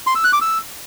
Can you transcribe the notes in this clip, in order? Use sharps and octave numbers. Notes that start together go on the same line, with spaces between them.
C6
E6
F#6
D6
E6